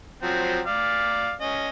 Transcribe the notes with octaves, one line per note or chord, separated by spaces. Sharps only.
F3 F#3 C4
D5 F5
C#4 D#5